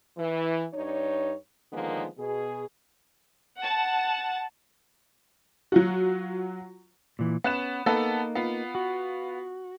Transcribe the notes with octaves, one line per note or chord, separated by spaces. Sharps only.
E3
G2 D4 D#4 C#5
D3 D#3 F3 G#3 A#3 B3
B2 G#4
F#5 A5
F#3 F4 F#4
A#2 E3
B3 C#4 F#6 E7
A#3 B3 D#4 A4
B3 F4
F#4